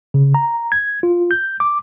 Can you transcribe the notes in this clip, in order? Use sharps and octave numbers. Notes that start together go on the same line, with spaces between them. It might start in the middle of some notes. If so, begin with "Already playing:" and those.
C#3
A#5
G#6
F4
G6
D6